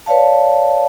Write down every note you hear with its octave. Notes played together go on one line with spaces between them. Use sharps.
B4 C#5 D5 F5 A5